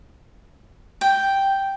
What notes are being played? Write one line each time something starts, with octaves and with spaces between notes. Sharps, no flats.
G5